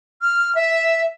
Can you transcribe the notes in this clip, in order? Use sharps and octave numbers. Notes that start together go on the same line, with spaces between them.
F6
E5